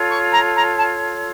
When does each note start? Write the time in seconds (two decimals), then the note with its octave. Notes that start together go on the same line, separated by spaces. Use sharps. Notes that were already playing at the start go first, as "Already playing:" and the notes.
Already playing: F4 A4 C#5
0.10 C#6
0.32 A#5
0.55 A#5
0.77 A5